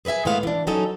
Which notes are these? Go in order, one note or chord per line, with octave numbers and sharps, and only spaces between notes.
G#4 B4 D#5 E5 G#5
A2 G#3 B3 F5 F#5
E3 D4
E3 F#3 C#4 D#4 A4 A5